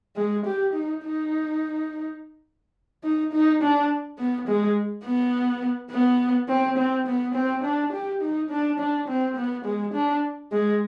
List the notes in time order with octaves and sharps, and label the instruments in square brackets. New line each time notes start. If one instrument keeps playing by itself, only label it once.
[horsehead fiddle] G#3
G4
D#4
D#4
D#4
D#4
D4
B3
G#3
B3
B3
C4
C4
B3
C4
D4
G4
D#4
D4
D4
C4
B3
G#3
D4
G#3